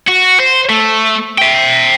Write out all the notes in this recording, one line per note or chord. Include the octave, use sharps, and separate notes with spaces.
F#4
C5
A3
E5 G5